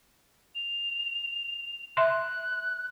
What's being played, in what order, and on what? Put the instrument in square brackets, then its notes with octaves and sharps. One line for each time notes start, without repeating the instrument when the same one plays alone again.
[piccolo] F7
[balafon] E5 C6 [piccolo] F#6